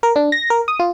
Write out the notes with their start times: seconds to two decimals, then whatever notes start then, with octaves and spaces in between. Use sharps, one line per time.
0.03 A#4
0.16 D4
0.32 A#6
0.50 A#4
0.68 D#6
0.79 F4